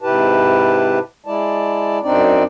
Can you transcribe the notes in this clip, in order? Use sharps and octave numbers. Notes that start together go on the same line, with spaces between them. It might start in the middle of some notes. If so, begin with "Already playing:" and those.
G#2 C3 E4 G4 B4 A5
G#3 E4 D5 A5
F#2 C4 D4 D#4 D5